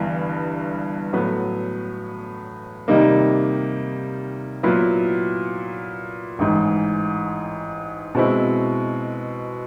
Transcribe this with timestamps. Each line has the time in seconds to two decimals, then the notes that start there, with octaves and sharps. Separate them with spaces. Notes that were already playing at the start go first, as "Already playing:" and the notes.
Already playing: G1 G2 E3
1.13 A2 F#3 B3
2.88 C3 D#3 G3 A#3 D#4
4.63 A#2 F#3 B3 E4
6.39 A1 G#2 E3
8.15 B2 G#3 C4 E4